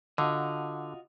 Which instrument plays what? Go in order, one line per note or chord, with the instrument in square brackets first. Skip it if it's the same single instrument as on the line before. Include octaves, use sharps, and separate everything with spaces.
[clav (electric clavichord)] D3 [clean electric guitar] F4 F#4 D#5